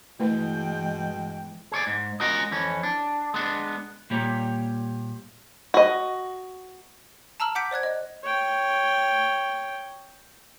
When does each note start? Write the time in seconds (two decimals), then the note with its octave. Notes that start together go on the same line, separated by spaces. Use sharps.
0.20 G2 B2 E3 G#3 A3 E4 B4 G5
1.16 E3
1.72 G#4 C#5 D5
1.87 G#2
2.20 G#3 C#4 F4 F#4 A#4 D#5
2.51 F2 E3 C#4
2.83 D4
3.34 G#3 B3 D4
4.10 A#2 G3 A#3 G4 C#5 A#5
5.74 F#4 D#5
7.40 A5 A#5 E6 F6 F#7
7.55 F#5 D6 G6 B6 D7
7.71 C5 D5 F#6 G#6
7.83 D#5
8.24 C#5 G5